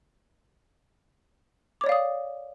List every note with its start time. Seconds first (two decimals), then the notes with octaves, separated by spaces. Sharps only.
1.81 D6
1.84 C#5
1.86 D5
1.89 F5
1.92 D#6